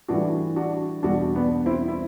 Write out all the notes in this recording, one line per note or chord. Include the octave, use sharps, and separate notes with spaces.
A2 E3 G3 D4 F#4
D4 F#4
E2 B2 G3 D4 F#4
B3 D4
C4 E4
E4